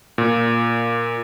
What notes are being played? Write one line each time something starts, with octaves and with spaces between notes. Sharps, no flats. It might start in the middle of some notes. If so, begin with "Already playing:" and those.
A#2